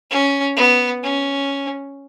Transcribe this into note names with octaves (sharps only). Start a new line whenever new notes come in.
C#4
B3
C#4